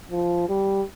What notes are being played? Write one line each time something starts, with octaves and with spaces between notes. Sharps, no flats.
F3
G3